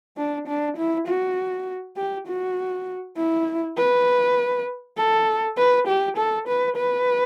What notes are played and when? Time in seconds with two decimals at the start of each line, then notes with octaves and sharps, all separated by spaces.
0.17 D4
0.48 D4
0.77 E4
1.07 F#4
1.97 G4
2.27 F#4
3.17 E4
3.78 B4
4.97 A4
5.58 B4
5.88 G4
6.17 A4
6.48 B4
6.77 B4